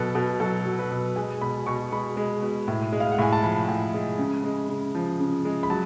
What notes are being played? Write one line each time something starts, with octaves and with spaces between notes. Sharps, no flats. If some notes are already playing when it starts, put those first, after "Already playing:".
Already playing: B2 F#3 A4 B4
B2 A4
F#3 A4
F#3
B4
B2
G#3 G#5
B2 B5
B2 C#6
G#3 B5
G#3
B2
A2
G#3
F5
F#5
A2 G#5
A5
F3 B5
A2
G#3
C#3
G#3
C#3
F3
C#3
G#3
B5
F#3 A5